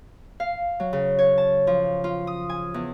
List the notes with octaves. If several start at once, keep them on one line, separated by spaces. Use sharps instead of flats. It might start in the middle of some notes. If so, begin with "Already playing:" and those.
F5
F#3
C#3
C#5
A5
F3
F4
D#6
G#5
E2